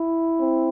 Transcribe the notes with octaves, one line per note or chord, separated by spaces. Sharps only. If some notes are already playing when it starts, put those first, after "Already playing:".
Already playing: E4
C4